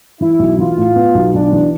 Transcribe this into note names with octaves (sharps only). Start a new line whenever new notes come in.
E3 E4
B1
E3 F4
A2
B3
B1
B1 D4
E3